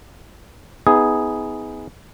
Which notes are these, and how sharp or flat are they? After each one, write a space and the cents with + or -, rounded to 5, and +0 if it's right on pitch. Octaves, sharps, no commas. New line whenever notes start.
B3 +20 D#4 +40 G#4 +0